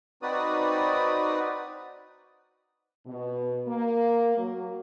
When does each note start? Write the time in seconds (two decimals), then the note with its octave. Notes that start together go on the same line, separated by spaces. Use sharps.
0.22 C4 D#4 F#4 B4 D5 D#6
3.05 B2
3.67 A#3
4.37 F#3